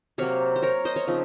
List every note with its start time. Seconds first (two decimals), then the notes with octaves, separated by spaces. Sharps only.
0.18 C3 F#3 A#3 C#5 F5
0.56 C5
0.62 A#4 C#5
0.85 C5 D#5
0.96 C#5 F5
1.07 C#3 F3 C4 D#4